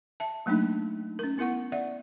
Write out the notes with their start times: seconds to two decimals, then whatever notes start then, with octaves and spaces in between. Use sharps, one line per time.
0.20 E5 A5
0.46 F#3 A3 A#3 D4 D#4
1.19 C#4 A#4
1.38 B3 E4 A#4 F#5 C#6
1.72 D5 E5 F#5